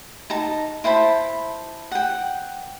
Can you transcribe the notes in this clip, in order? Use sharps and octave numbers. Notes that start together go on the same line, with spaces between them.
D#4 A5 A#5
E4 C5 A5 B5
F#5 G5